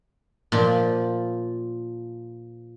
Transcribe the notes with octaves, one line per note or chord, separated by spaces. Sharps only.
A#2 F3